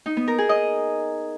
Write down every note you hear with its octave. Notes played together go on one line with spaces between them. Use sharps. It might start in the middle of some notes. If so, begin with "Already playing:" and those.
D#4
B3
A#4
G#4
D#5